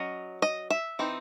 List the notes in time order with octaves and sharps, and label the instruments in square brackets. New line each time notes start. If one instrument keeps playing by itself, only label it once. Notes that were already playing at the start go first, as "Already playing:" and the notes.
Already playing: [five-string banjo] F#3 C#4 D#5
D#5
E5
E3 C4 D#4